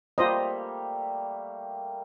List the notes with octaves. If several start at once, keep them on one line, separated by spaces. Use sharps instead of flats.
G3 A3 A#3 F4 C5 D#5